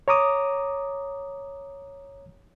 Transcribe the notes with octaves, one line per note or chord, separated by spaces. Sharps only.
C#5 A#5 D6 D#6